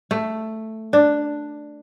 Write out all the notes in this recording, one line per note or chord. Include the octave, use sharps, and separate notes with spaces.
A3
D4